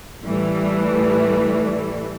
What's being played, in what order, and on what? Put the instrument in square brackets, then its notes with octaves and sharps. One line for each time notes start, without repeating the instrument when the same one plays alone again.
[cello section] A2 E3 G3 A3